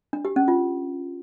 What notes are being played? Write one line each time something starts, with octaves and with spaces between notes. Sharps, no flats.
D4
G4
C#4
F4